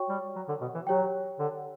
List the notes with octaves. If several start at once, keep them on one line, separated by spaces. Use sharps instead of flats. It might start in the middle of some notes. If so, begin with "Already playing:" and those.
Already playing: F#4 C#5 G5 C#6
G3
F#3
D3
B2
E3
F#3 G4 C#5 G5
D3